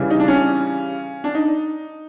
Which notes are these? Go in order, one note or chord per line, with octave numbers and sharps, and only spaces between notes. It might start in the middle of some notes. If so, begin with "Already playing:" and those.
Already playing: C#3 E3 G3
D#4
D4
C#4
D4
D#4